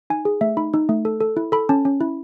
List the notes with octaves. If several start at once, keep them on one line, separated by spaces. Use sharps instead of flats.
D#4 G#5
G#4
A3 E5
D#4 B5
D#4
A3
A4
A4
E4
A4 B5
C#4 A5
C#4
E4